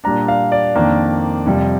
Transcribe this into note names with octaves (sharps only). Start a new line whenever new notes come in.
A#2 G3 D4 A#5
F5
D5
F2 D#3 A#3 D4
F2 C3 G3